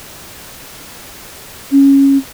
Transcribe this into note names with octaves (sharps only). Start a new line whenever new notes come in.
C#4